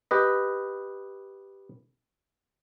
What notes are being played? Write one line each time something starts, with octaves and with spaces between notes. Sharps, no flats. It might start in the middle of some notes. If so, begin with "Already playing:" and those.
G4 B4 D#5